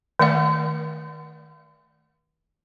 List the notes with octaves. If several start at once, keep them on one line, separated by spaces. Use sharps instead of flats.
D#3 A3 D5 F#5